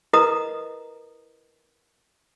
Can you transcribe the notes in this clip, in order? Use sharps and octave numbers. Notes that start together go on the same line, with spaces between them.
E4 A#4 B4 D#5 A#5 D#6